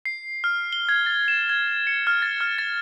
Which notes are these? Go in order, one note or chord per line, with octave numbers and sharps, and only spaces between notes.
C7
F6
G7
G#6
A6
E7
G#6
C#7
F6
A6
F6
A6